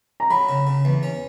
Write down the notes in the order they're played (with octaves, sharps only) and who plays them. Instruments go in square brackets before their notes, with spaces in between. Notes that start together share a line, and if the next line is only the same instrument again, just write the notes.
[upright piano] A#5
[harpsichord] F#3 [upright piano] B5
[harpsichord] C#3
C#3
E2
C#4